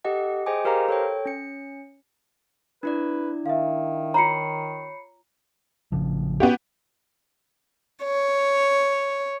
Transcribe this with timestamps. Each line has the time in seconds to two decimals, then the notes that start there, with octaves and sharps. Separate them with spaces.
0.04 G4 A4 D#5 F#5
0.46 G#4 C5 D#5 G5 G#5 D6
0.65 G4 A#4 C5 F5 A#5
0.89 A4 C#5 G5
1.26 C#4 C#7
2.83 D4 E4 B4 D5
3.46 D#3 E5 F5
4.14 F4 C#5 A#5 B5 C7 C#7
5.92 A1 C#3 F3
6.40 B3 F#4 G4
8.04 C#5